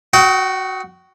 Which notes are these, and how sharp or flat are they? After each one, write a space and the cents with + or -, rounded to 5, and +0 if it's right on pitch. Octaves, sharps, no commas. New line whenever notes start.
F#4 +0 G5 -40 D#6 +40